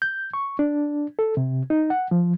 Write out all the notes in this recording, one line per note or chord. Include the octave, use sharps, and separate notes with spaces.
G6
C#6
D4
A4
C3
D#4
F#5
F3